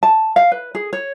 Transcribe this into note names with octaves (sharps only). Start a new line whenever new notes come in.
A5
F5
B4
G#4
C#5